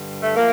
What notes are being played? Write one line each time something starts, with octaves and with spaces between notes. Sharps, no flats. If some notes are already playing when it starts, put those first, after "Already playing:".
Already playing: G2 D3
A3
F3 A3 A#3